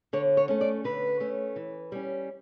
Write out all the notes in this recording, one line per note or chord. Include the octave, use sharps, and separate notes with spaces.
D3 C#5
C#5
A3 C#4
D5
D3 B4
A3 C#4
E3
G3 C#4